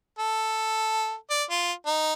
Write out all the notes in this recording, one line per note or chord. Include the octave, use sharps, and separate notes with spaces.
A4
D5
F4
D#4